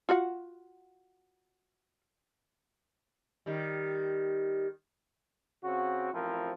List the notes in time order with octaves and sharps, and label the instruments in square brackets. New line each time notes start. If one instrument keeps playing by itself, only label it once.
[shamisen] F4 F#4 F#5
[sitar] D#3 G3
[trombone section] C#3 C4 F#4
A1 F3 C4 E4 A#4